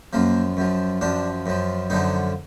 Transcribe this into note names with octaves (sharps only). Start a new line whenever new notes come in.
F#2 F3 A#3
F#2 F3
F#2 F3 D4
F#2 F3
F#2 D3 F3 D#4